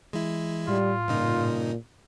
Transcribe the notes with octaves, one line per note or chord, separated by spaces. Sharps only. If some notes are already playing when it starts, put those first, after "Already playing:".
E3 G#3 E4
A2 G3 F4
G2 A#2 C#3 D#4